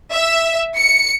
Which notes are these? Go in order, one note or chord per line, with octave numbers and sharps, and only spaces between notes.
E5
C#7